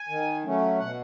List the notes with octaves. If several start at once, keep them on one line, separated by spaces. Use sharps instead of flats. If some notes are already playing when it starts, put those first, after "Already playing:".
Already playing: G#5
D#3
F#3 A3 C#4
B2 F#5